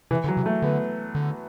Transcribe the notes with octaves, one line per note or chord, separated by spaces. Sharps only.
C3 E3
D3
F#3
C3
A3
D3 B3
D3